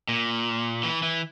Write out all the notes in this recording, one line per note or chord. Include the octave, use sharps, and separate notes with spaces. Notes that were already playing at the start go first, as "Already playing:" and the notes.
A#2
E3
E3